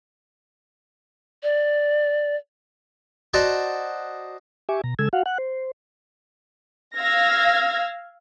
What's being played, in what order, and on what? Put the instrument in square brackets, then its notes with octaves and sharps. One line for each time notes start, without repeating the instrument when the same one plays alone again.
[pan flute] D5
[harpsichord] F#4 C5 D5 D#5 A5 A#5
[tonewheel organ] G4 E5 G#5 C#6 D6
B2 A#5
C#3 G#3 A4 E6 G#6
F#4 F5 F#5
F#5 F#6
C5
[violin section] F5 E6 F6 G#6 A#6